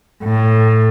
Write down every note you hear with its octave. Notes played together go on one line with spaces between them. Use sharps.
A2